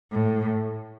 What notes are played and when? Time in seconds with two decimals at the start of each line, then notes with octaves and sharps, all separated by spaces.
0.12 A2